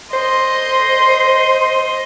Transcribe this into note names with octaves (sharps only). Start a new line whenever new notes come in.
C5 D#5 C6